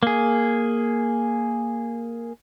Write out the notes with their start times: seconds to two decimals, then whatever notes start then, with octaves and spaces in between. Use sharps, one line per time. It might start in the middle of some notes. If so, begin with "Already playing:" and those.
0.03 A#3 G#4